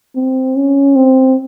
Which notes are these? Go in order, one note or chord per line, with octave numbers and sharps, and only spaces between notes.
C4
C#4
C4